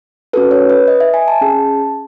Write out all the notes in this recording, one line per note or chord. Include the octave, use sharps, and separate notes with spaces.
C#4 F#4 A4 B4
C#5
B4
D#5
E5
G#5
A5
C#4 G#4 A5